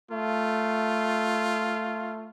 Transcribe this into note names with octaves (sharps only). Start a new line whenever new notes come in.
A3 F4